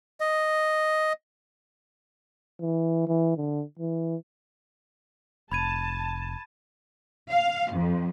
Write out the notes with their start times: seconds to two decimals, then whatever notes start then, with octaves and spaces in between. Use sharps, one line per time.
0.20 D#5
2.61 E3
3.07 E3
3.37 D3
3.79 E3
5.52 F1 A5 B5 G#6 D#7
7.30 F5
7.73 F2